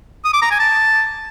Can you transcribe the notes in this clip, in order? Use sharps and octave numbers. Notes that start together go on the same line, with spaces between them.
D#6
D6
A#5
G#5
A5